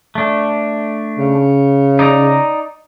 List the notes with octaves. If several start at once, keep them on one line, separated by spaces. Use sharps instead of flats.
A3 D4
C#3
D#4 D5 A#5